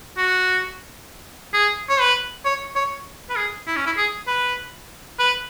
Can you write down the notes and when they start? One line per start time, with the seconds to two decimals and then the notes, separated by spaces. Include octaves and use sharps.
0.17 F#4
1.54 G#4
1.89 C#5
2.00 B4
2.45 C#5
2.76 C#5
3.30 B4
3.36 G#4
3.67 E4
3.76 C#4
3.86 E4
3.97 G#4
4.27 B4
5.19 B4